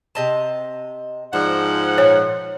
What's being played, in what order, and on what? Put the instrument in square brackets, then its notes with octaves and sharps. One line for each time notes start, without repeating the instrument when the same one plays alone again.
[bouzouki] C3 D#5 A5
[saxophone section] G#2 F3 F#5 [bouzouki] D4
[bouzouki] A#2 [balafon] C#5